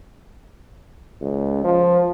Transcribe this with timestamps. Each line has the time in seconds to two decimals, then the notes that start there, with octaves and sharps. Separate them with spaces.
1.21 C#2
1.64 F3